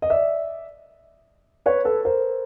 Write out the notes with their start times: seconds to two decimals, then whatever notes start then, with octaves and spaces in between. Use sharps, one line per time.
0.02 D#5
0.10 D5 E5
1.66 B4 C#5
1.85 A4 B4
2.05 A#4 C5